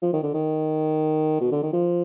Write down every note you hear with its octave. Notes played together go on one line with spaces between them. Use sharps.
F3
D#3
D3
D#3
B2
D3
D#3
F3